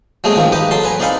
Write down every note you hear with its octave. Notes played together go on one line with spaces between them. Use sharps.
F#3 G#3 A3 C4 G#4 D#5
D#3 F3 C4
D#4 G4 B4 D#5
F#3 A4 C6
B4 G#5 A#5
C4 D#4 D5 F5 F#5 B5